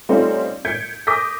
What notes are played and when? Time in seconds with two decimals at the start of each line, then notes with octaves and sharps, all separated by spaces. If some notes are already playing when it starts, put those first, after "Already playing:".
0.09 G3 A3 C4 C#4 D#4 F4
0.65 G6 G#6 B6 C#7 D7
1.07 D6 D#6 G6 A#6 B6